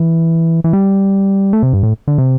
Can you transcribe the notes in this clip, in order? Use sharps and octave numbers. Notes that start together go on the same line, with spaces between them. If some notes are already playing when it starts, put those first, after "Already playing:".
Already playing: E3
E3
G3
A3
C3
G2
A2
D3
C3